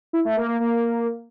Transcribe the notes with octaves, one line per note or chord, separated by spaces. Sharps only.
E4
A3
A#3
A#3
A#3